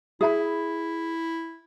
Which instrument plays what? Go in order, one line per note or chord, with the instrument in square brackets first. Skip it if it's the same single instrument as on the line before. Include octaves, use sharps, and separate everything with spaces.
[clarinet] E4 [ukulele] G#4 E5 B5